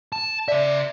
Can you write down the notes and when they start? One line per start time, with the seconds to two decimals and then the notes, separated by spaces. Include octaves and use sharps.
0.12 A5
0.48 C#3 D5 E5